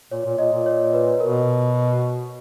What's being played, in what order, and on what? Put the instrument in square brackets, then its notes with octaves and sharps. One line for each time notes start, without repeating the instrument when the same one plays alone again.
[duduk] A#2 [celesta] C#5
[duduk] A#2
[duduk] A#2 [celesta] D#5
[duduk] A#2
[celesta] C#5
B4
[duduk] B2 [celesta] A#4